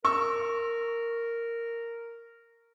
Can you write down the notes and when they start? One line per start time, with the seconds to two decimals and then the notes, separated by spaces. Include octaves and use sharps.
0.05 A#4 C#6 E6